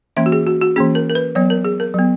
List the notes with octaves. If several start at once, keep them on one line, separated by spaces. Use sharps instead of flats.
E3 A#3 C#4 E5
F#4
G#4
F#4
F#4
E3 A#3 C#4 G#4
A#4
A#4
B4
F#3 B3 C#5
A#4
G#4
A#4
F#3 B3